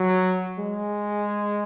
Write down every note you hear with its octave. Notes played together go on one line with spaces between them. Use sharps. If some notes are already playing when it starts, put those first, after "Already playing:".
Already playing: F#3
G#3